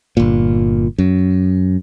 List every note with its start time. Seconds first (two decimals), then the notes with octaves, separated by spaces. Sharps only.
0.17 G1 A#2
0.98 F#2